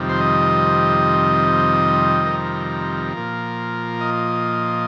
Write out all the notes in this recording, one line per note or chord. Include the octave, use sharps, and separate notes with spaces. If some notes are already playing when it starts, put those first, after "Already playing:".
Already playing: F2 C3 D#3 G3
C5
D#5
A#4
A#2 F3
D#5